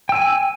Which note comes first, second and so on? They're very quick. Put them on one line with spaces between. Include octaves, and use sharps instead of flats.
G5 E6 G#5